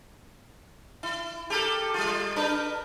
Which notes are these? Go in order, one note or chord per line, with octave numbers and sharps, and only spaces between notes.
E4
G4 A4 A#4
G3 F4
D4 A#4 B4